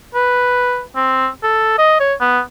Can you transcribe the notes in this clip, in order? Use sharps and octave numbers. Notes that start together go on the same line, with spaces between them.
B4
C4
A4
D#5
C#5
B3